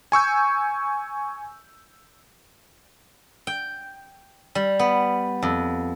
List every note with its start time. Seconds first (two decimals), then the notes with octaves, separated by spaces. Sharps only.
0.12 G#5 C#6 E6 G6
3.47 G5
4.55 G3
4.79 B3
5.43 F2